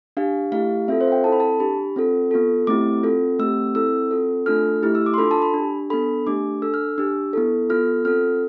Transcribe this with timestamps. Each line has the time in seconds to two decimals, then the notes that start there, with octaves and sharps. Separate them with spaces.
0.17 D4 G4 F5
0.52 A3 E4 G4 F5
0.88 C4 F4 A4 E5
1.01 C5
1.07 F5
1.12 G5
1.24 C4 E4 A4 A5
1.32 B5
1.40 A5
1.60 D4 G4 B5
1.96 C4 F4 A4
2.31 B3 F4 A4
2.67 A3 C4 E4 G4 D6
3.03 C4 F4 A4
3.39 A3 C4 G4 E6
3.75 C4 E4 A4 E6
4.11 C4 F4 A4
4.46 A3 D4 F4 A4 F6
4.82 A3 E4 G4 F6
4.95 E6
5.06 D6
5.14 C6
5.18 D4 F4 A4 B5
5.31 A5
5.42 B5
5.54 D4 G4
5.90 B3 D4 A4 B5
6.26 A3 D4 G4 D6
6.62 D4 A4 E6
6.74 F6
6.98 D4 G4 E6
7.33 B3 E4 A4
7.70 B3 F4 A4 F6
8.05 C4 F4 A4 F6